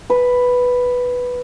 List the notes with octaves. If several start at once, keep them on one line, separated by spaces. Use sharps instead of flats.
B4